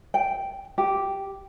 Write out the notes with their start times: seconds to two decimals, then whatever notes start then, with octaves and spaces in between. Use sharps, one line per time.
0.14 G5
0.78 G4